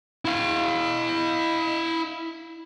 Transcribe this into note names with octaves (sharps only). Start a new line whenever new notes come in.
E4 F5